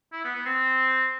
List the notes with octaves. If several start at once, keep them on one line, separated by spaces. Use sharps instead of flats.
E4
B3
B3
C4